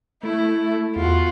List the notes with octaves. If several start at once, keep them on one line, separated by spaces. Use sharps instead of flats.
A3 E4
E2 F4 F#4